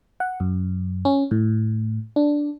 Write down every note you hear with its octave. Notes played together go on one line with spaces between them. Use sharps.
F#5
F#2
C#4
A2
D4